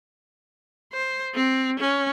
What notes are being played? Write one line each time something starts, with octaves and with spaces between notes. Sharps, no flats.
C5
C4
C#4